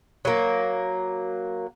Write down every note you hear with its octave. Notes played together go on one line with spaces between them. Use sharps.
F#3 A#3